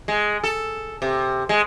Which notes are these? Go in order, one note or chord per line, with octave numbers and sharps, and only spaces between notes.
G#3
A4
C3
G#3